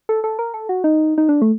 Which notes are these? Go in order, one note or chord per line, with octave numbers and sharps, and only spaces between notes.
A4
A4
A#4
A4
F#4
D#4
D#4
D4
A3